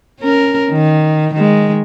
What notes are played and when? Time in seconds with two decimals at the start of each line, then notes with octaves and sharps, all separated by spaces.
0.20 C#4 A#4
0.71 D#3
1.34 D#3 G#3